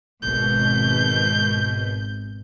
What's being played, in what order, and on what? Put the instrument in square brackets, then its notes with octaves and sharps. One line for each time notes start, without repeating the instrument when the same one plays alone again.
[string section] G#1 B2 [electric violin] G6